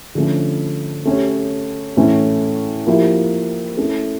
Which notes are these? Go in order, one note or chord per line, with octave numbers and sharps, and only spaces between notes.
D3 F3 A3 C#4
A3 C#4 G4 C#5
A2 E3 A3 C#4
F3 A#3 E4 G4
A3 C#4 E4 A4